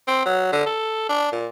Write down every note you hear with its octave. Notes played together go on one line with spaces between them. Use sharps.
C4
F#3
D3
A4
D4
A#2